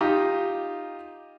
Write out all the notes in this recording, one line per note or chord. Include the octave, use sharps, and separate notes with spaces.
D#4 F4 G4